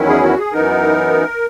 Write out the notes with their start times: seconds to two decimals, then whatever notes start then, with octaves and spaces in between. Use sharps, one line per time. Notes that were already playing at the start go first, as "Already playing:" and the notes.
Already playing: E2 D#3 F#3 C#4 E4
0.08 G#4
0.23 F#4
0.38 G#4
0.53 F#2 E3 B3 D#4 A#4